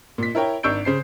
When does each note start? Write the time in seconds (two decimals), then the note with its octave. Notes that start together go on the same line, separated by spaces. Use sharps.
0.18 A#2 B6
0.35 E4 A#4 C#5 G5
0.63 G#1 D4 C#6 E6 G6 D7
0.85 C#3 C5 C7